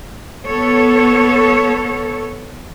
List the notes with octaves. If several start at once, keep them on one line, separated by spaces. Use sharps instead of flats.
B3 A4 C#5